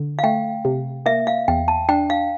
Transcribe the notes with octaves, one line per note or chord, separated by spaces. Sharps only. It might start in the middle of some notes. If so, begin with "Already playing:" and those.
Already playing: D3
F5
A3 G5
C3
A#3 E5
F5
E2 G5
A5
D4 G5
F5